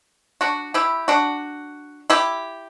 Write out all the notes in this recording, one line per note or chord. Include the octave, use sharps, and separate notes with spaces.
D4 F#4
E4 G4
D4 F#4
E4 G4